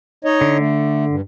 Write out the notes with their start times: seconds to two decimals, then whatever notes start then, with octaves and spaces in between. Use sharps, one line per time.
0.25 D#4 C#5 D#5
0.41 D3
0.59 A3
1.09 G2